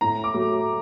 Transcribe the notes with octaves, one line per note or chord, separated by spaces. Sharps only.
A2 A#5
D6
F#3 A3